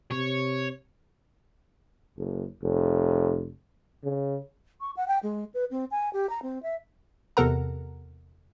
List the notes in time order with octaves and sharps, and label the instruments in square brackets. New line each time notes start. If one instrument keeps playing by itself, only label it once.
[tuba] C3 [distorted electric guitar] C#5
[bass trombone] F#1
F1
C#3
[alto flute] C#6
F#5
G5
G#3
B4
C4
G#5
G4
A#5
C4
E5
[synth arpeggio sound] E2 C3 A4 A#4 F#5 A#5